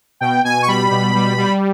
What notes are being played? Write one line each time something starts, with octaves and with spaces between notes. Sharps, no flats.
B2 G5
B2 G#5
C#6
G3 B5
B2
G3
G3